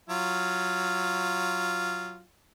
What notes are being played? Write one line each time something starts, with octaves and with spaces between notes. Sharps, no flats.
F#3 F4